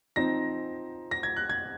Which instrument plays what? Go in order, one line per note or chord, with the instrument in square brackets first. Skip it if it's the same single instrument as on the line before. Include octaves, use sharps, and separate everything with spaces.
[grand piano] F3 C4 D#4 A#6
A#6
G#6
F#6
G#6